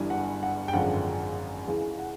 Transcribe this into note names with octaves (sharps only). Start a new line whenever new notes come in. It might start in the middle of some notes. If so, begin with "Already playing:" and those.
Already playing: G1 G2 E3 G3 G#5
F#5
F#5
G5
G#1 F#2 D3 F3 G#3 F#5
C#2 C#3 E3 G#3
F#5